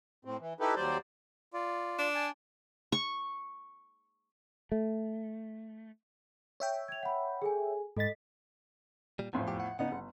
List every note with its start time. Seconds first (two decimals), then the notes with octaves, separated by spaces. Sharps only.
0.25 A2 C4
0.40 E3
0.60 D#4 E4 G4 A4 B4
0.75 D#2 F#3 G3 C5 D5
1.53 F4 D5
1.99 D4
2.15 G#5 A5
2.92 C#6
4.72 A3
6.60 C#5 E5 G5
6.88 G#6 F7
7.03 F#5 B5
7.42 G#4 A4 G#5
7.97 G#2 A4 D#5 A6 B6
9.19 A#2 G3
9.33 E2 A2 E3 F3
9.48 F2 G4
9.60 F#5
9.79 C#3 B3 D#4 F#5
9.92 G1